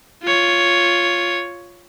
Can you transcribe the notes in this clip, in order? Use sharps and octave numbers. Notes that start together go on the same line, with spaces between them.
F4 C#5